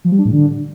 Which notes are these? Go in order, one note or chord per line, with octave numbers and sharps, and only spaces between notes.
F3
G3
D4
A2
D3